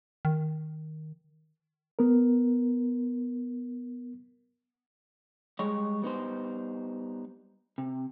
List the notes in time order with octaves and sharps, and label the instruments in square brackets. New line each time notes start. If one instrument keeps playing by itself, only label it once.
[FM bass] D#3
[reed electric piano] B3 A#4
[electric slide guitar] G3 G#3 C#5 D#5
G3 B3 D#4 C5
C3